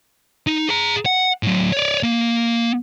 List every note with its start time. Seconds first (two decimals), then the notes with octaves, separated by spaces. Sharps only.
0.47 D#4
0.69 G#4 A#5
1.06 F#5
1.43 A2 F#3
1.72 C#5 D5
2.03 A#3